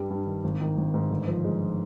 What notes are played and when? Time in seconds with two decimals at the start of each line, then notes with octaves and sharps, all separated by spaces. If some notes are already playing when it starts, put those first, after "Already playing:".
Already playing: G2 G3
0.10 G2
0.26 D#3
0.44 G#1
0.61 D#3
0.78 G#1
0.94 G#2
1.10 G1
1.28 F3
1.44 G#3